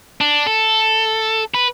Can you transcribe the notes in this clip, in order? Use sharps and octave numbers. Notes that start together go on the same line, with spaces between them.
D4
A4
B4